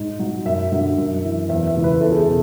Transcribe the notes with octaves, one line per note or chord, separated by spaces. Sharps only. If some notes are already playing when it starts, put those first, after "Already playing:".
Already playing: G#2
F#3
F#2 E5
D3 F#3 E5
F#2
E3
E2 E5
E5
C#3 E3
B4
E2 A4
G#4
B2 A4